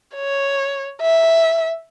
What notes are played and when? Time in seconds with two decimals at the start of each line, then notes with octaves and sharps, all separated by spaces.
0.16 C#5
1.02 E5